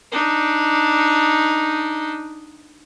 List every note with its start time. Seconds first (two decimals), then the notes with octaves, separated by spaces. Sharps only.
0.12 D4 D#4